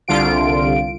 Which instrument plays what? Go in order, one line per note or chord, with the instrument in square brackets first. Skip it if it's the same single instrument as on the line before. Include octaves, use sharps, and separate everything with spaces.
[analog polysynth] C2 D3 F4 D7